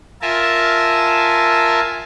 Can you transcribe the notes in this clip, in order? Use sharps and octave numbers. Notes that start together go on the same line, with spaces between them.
F4 A#4 E5 G#5 A5